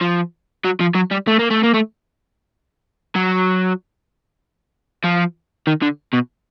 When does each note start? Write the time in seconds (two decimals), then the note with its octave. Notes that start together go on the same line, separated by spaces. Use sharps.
0.01 F3
0.65 F#3
0.81 F3
0.95 F#3
1.11 G3
1.28 A3
1.39 A#3
1.50 A3
1.63 A#3
1.74 A3
3.16 F#3
5.04 F3
5.67 D#3
5.82 D3
6.14 B2